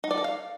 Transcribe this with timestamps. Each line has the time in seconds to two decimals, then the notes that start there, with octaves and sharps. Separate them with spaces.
0.04 D#4
0.11 D5
0.17 A4
0.24 F5